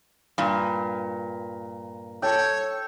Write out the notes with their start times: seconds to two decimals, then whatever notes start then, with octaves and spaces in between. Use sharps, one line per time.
0.38 G2 A#2
2.22 A4 C#5 G5